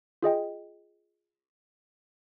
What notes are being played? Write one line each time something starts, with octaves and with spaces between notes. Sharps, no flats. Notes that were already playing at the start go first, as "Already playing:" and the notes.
F4 G#4 D#5 G5